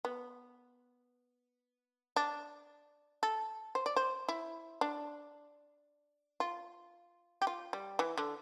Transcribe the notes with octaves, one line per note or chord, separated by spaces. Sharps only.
B3
D4
A4
C5
D5
C5
E4
D4
F4
G4
F4
G3
E3
D3